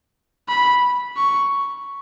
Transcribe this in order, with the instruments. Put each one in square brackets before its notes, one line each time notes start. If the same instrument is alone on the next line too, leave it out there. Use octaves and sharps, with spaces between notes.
[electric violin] B5
C#6